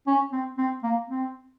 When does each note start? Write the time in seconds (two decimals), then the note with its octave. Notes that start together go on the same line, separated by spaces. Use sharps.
0.07 C#4
0.32 C4
0.58 C4
0.83 A#3
1.09 C4